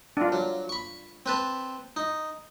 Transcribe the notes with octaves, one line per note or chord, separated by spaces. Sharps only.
D4 F4
F#3
B5 C#6
C4 B4 A5
D#4